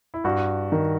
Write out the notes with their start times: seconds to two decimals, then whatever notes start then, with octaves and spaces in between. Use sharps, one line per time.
0.14 E4
0.24 G2 F#4
0.72 D#3